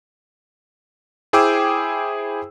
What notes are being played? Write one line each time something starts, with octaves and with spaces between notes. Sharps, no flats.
E4 G#4 C5 G5 D6 E6